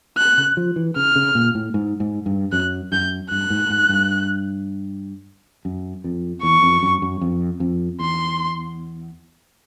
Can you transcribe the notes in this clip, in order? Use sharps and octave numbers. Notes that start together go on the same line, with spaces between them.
F#6
C#3
F3
E3
C#3 F6
C#3
A#2
A2
G#2
G#2
G2
F#2 F#6
F#2 G6
G2 F#6
G#2
G#2
G2
F#2
F2
E2 C#6
F2
F#2
F#2
F2
F2
E2 C6